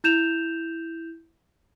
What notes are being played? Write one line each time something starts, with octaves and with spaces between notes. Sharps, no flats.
E4 G6 E7 F7